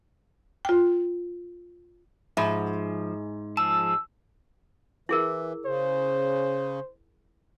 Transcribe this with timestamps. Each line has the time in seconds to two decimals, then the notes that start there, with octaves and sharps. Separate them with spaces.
0.65 F4 G5
2.37 G#2 F3 E5 B5
3.57 F3 G#4 A5 E6
5.09 E3 E4 G#4 A#4
5.65 C#3 C5